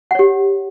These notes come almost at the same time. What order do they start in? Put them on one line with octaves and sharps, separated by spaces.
F#5 C#5 G4